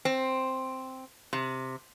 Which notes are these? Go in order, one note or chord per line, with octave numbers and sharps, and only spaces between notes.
C4
C3